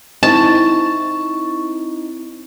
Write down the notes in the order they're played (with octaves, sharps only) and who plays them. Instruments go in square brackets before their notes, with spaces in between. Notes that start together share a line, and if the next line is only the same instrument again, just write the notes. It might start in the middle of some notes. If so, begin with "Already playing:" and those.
[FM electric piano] C4 E4 [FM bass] D#4 [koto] A5 [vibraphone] C#6